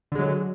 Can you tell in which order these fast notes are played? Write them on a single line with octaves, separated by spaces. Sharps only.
D3 G#3 F#3